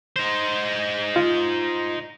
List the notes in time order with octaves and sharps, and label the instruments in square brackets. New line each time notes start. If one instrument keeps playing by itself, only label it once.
[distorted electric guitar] D#4 C5
[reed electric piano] F4